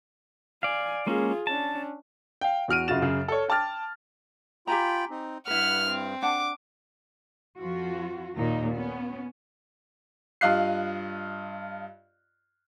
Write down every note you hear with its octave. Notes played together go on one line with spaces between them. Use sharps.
D5 F5 G#5
G#3 A#3 C#4 F4 G#4
C#4 D4 A5
F5 G5
E2 F#4 F6 D7 D#7
F#2 C#3 F4 F#4 A6 E7
F#2 C#3
A4 C#5
G5 A5 D6 F6 A6
F4 G4 G5 G#5 A#5 B5
C4 D#4
G2 E4 B4 F#5 F6
C4
D4 F#5 A5 D6
F2 F3 F4 F#4
D#2 A#2 D#4
B3 C#4
G2 F4 D#5 F5 F#6 C7